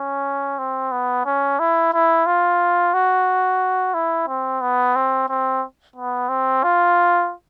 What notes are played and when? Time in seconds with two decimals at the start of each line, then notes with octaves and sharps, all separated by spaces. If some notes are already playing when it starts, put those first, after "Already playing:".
Already playing: C#4
0.59 C4
0.92 B3
1.25 C#4
1.60 E4
1.93 E4
2.26 F4
2.94 F#4
3.94 E4
4.28 C4
4.61 B3
4.96 C4
5.29 C4
5.96 B3
6.29 C4
6.64 F4